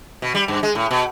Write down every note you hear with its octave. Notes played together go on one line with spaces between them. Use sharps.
B2
G3
G2
G#3
A2
B2